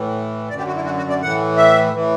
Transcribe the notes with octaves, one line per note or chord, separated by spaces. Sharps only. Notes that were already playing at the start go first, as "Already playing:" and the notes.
Already playing: A2 E3
F#2 D3 G4 D5
F#4
E4
F#4
F#4
D5
A2 E3 F#5
E5
A2 E3